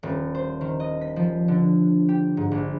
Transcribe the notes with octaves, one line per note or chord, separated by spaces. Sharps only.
D#1
C5
D#3
D#5
B6
F3
D3
G4
G#2
A#1